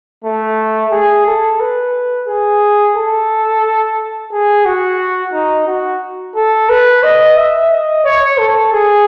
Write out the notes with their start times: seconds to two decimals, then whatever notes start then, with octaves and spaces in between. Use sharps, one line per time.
0.24 A3
0.92 G#4
1.26 A4
1.60 B4
2.28 G#4
2.96 A4
4.32 G#4
4.65 F#4
5.33 D#4
5.67 F#4
6.35 A4
6.69 B4
7.03 D#5
7.37 E5
7.71 D#5
8.05 C#5
8.38 A4
8.73 G#4